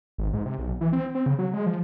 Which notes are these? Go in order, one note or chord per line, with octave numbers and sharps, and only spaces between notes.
G#1
G#2
C3
B1
E3
C4
C4
C#3
F#3
G#3
F3